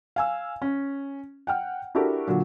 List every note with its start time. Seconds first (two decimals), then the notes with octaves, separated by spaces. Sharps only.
0.16 F5 G#5 E6
0.62 C#4
1.47 F#5 G5 F6
1.95 D4 E4 F#4 G4 A4 A#4
2.27 A#2 D3 F#3